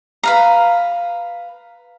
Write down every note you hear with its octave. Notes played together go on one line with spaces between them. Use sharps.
B4 F5 A#5